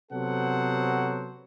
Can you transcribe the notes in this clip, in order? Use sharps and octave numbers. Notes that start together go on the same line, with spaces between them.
C3 F#3 B3 A4 C5 F#5